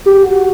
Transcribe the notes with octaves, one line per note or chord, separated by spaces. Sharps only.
G4
F#4